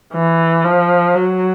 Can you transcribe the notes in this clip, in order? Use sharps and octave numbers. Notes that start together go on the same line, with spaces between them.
E3
F3
F#3